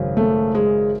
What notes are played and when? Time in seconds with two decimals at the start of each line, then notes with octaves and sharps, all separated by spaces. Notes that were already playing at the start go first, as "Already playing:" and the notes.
Already playing: G#1 F#2 C#3
0.17 A3
0.55 G#3